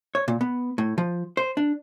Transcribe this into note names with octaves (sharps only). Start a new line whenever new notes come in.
C#5
A#2
B3
A2
F3
C5
D4